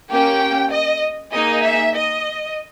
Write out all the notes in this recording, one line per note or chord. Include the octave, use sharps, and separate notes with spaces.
A#3 C#4 G4 G5
D#5
A#3 D#4 G#4 D#5
E5
D#5